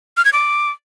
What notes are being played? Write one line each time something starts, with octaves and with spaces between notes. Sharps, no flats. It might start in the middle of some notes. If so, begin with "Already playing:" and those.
F6
G#6
D6